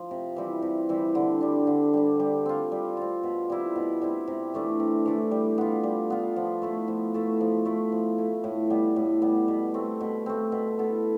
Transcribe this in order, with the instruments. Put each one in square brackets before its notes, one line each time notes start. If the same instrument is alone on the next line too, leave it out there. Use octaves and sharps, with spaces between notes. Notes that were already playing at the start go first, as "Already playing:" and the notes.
Already playing: [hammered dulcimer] F3
C3
E3 G3 C4
C3
E3 G3 C4
D3
G3 D4
D3
G3 D4
G3
C4 F4
G3
C4 F4
B2
G3 C4 E4
B2
G3 C4 E4
C3
E3 A3 D4
C3
E3 A3 D4
G3
B3 F4
G3
B3 F4
F3
A3 E4 A4
F3
A3 E4 A4
F3
A3 E4
F3
A3 E4
A2
G3 B3
A2
G3 B3
B2
A3 C4
B2
A3 C4
B2
B3 E4 A4